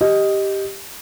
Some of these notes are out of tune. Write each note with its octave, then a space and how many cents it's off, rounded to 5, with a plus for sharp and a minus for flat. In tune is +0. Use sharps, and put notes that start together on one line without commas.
G4 +0 D#5 +0